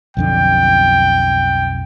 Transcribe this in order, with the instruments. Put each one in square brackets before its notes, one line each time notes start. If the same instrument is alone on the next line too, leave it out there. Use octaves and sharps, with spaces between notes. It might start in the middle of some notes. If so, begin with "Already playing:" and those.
[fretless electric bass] B1 F2 D3 [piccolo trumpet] G5